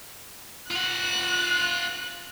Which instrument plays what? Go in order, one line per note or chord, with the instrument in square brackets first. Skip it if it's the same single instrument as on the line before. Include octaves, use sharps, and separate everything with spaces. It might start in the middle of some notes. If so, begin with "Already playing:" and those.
[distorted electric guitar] F4 F#5 [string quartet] F#6